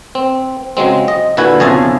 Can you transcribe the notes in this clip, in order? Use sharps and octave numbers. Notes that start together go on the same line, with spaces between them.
C4
C#3 F#3 G#3 C4
D#5
A#2 D3 E4 F#4 B4 G#5
B1 F2 C#3 G#4 G#5 A5